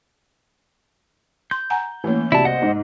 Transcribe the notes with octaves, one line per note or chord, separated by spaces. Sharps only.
C6 G6
F#5 G#5 A#5
E3 A3 A#3 C#4
C2 C3 E4 F#4 D5 A5
C5 D#5 F#5
G#2 D#4